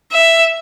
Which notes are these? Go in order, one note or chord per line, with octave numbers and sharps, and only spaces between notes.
E5